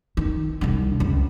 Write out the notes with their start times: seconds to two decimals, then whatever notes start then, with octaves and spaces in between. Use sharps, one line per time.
0.17 D#3
0.61 C2 D4
1.00 C#2